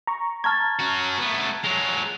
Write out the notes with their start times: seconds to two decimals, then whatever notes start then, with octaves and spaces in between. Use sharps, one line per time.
0.07 A#5 C#6
0.44 A5 A#5 C#6 F6 G#6 A6
0.79 C#4 F#4
1.19 A3 B3
1.64 F#3 G#3 F7